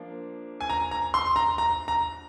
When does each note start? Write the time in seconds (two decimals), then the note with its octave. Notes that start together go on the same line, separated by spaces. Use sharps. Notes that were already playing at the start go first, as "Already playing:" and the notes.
Already playing: F3 A#3 D4
0.61 G#5
0.70 A#5
0.91 A#5
1.14 C6
1.36 A#5
1.58 A#5
1.88 A#5